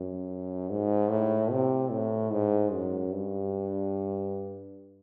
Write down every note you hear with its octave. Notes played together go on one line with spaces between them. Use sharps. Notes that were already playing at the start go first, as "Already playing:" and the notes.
Already playing: F#2
G#2
A2
C3
A2
G#2
F#2
G2